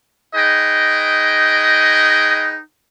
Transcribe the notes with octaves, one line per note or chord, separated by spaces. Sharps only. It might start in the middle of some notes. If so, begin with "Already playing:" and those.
D#4 G#4 B4 D#5 G5